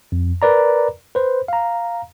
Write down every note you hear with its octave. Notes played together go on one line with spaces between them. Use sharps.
F2
A#4 B4 D5 A#5
B4 C5
F5 A#5